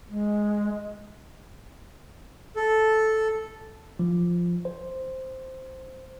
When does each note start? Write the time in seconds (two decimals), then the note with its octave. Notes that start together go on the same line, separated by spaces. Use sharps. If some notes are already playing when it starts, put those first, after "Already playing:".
0.09 G#3
2.56 A4
3.99 F3
4.65 C5